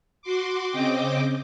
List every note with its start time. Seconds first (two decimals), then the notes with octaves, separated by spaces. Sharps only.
0.22 F#4 C6 D6
0.70 C#3 C4 D#5 G5 D6